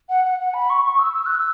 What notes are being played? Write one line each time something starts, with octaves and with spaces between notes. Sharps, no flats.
F#5
F#5
F#5
B5
C#6
C#6
E6
E6
F#6
E6